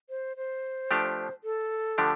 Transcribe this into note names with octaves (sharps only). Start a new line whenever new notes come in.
C5
C5
F3 A3 D4 G4
A4
D3 F3 A3 D4 G4